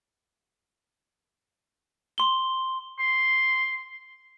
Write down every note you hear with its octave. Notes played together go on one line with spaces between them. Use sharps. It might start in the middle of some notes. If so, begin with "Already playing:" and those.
C6 G7
C6